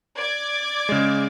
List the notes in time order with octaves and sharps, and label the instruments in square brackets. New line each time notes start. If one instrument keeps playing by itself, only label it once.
[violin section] D5 D6 G#6
[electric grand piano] C#3 G#3